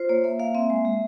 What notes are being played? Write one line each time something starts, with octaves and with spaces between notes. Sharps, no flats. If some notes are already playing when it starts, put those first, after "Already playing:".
Already playing: F4 C5
A#3 C#5
A#3 E5
A#3 F5
C4 E5
G#3 E5
G#3